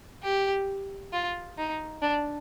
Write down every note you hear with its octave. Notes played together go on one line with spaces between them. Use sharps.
G4
F4
D#4
D4